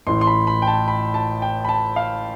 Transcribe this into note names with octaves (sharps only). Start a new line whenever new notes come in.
A1 A2 E3 C6
C6
B5
B5
G5
A5
B5
A5
G5
B5
A5
F5